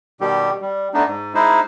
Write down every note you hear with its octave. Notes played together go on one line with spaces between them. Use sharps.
B2 D#3 G3 G4
G3
A3 B3 D4 D#4
G#2
G#3 D#4 E4 C5